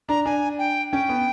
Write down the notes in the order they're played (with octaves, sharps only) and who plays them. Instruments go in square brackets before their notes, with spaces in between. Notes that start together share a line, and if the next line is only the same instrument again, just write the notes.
[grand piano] D4 [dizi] A#5
[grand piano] D4 [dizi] G#5
[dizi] G5
[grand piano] C#4 [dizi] G5
[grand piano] B3